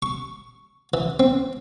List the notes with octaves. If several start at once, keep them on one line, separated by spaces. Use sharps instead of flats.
C#6
E3
C4